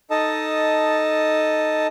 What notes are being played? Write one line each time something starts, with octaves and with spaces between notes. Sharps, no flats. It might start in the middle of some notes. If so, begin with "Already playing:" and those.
D#4 A4 D#5 A5